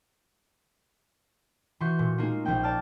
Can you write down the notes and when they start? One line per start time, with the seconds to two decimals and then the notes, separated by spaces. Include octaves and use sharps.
1.80 E3 F#4 C6 C#6 G6 C7
1.99 A#2
2.18 G#3 A#3 D#4 F4
2.45 A#1 F3 A#3 G5
2.63 D5 A5 F6